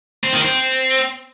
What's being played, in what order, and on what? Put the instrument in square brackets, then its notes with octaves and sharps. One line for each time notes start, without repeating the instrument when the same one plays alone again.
[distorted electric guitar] C4
D#3
C4